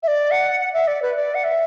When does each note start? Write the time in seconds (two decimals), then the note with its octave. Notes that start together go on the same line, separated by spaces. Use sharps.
0.03 E5
0.08 D5
0.31 F#5
0.59 F#5
0.73 E5
0.87 D5
1.02 B4
1.16 D5
1.35 F#5
1.44 E5